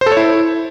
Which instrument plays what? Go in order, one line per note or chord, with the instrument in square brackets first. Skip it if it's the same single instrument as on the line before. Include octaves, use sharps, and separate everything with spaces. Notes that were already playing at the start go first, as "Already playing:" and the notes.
[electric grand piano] C5
A4
C#5
E4